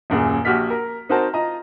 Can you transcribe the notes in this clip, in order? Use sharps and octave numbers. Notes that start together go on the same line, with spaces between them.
D#1 F#2 A#2 G#4
A#1 F#4 G4 F6 B6
A#4
C4 D#4 F#4 A#4 C5 A5
F4 D#5 A#5